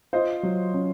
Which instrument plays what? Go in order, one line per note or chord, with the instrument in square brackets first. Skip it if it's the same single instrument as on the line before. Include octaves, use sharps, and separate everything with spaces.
[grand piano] F4 [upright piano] C5 D#5
[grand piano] F#3
C#4